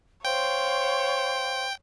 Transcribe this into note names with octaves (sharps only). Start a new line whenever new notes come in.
C5 C#5 F5 G5 C6